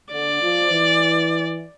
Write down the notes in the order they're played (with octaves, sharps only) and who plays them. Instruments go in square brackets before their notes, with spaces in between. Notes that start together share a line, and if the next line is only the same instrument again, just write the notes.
[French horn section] D3 [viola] D5
[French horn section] F3
E3